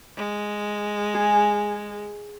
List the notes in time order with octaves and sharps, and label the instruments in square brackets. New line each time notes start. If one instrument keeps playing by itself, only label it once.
[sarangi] G#3
[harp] G#4